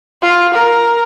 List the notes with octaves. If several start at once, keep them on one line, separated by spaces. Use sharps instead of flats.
F4
A#4